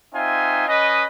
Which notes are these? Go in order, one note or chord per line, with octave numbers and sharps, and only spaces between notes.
C4 D#4 F4 E5 G#5
C#4 B4 D#5